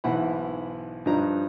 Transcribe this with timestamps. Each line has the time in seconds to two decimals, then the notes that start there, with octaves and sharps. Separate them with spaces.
0.04 B1 G#2 E3 E4 F#5 B5
1.06 G2 F3 D4 D#4 A#5